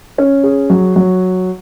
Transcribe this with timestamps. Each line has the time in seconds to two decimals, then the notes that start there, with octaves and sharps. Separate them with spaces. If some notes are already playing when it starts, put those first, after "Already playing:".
0.18 C#4
0.43 G#4
0.70 F#3
0.96 F#3